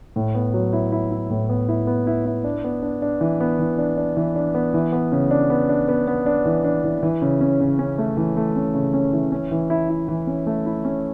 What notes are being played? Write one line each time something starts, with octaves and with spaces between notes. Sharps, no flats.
A2
B3
F#3
E4
E4
E4
A2
B3
E4
B3
E4
E4
D4
B3
D4
D4
E3
B3
E3
D4
D4
E3
D4
B3
E3
B3
C#3
D4
B3
D4
B3
B3
D4
E3
D4
E3
E3
C#3
C#4
C#3
C#4
A3
E3
A3
C#4
C#3
C#4
E3
C#4
E3
E4
E4
E3
C#4
A3
E4
C#4